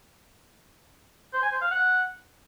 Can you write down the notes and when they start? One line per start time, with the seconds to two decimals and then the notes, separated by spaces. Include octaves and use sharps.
1.33 C5
1.43 G#5
1.52 C5
1.62 F5
1.71 F#5